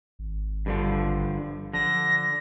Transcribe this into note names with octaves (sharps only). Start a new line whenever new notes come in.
G#1
G2 D3 F3
D3 F3 A#6